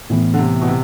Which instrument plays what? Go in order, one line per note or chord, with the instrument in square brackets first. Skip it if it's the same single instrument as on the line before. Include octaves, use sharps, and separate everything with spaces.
[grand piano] A2 E3 B3
[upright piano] D3
C3
B2
C3